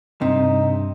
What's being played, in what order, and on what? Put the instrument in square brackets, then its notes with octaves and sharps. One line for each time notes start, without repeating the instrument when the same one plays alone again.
[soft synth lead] G2 [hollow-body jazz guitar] C3 [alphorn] D#4